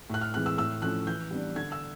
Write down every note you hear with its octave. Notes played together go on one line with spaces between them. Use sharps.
A2 F#6
F6
E3 G#3 C4 F#6
E6
A2 E6
F3 A3 C#4 F#6
E3 G6
G3 B3 D4
D3 G#6
E6